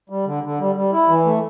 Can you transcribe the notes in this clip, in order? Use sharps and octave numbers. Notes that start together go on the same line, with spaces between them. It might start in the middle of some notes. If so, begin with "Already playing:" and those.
G3
D3
D3
G3
G3
E4
E3
A3